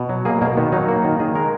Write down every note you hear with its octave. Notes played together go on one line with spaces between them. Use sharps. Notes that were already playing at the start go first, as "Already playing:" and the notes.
Already playing: B2
F#3
A#3 G#4
B2 A#3
D#3 B3
F#3 D#4
A#3 F#4
D#3
D#3 G#4
G#3 A#4